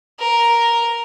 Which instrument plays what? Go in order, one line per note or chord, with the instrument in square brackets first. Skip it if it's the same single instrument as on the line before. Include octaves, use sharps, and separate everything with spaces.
[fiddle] A#4